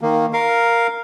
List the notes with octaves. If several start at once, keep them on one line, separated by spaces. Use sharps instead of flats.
D#3 A#3
A#4 F5